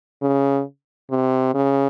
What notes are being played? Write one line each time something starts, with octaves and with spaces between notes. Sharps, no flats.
C#3
C3
C#3